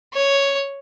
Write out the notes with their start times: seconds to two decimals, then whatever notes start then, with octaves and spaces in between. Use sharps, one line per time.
0.14 C#5